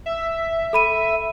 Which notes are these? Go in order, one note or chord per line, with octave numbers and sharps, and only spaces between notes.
E5
A4 B5 D#7